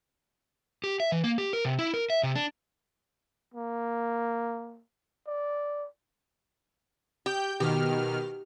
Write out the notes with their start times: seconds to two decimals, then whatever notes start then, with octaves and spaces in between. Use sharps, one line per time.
0.84 G4
1.00 E5
1.12 E3
1.24 A#3
1.38 G4
1.53 A#4
1.65 C3
1.79 E4
1.94 A#4
2.10 E5
2.23 C3
2.35 D4
3.54 A#3
5.27 D5
7.26 G4 G5 G6
7.60 B2 D#3 G4 F6